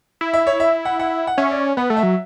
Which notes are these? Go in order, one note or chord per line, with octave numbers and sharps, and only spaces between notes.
E4
E5
C#5
E5
F#5
F#5
F#5
C#4 E5
D5
B3 F#5
A3
E5
F#3